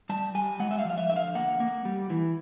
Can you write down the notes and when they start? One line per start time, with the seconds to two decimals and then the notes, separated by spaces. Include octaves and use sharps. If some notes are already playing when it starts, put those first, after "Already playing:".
0.09 G3 A5
0.35 G3 G#5
0.60 G#3 F#5
0.71 E5
0.79 F5
0.85 F3
0.90 F5
0.98 E5
1.10 D3 E5
1.16 F5
1.35 A#3 F#5
1.60 A#3
1.85 G3
2.10 E3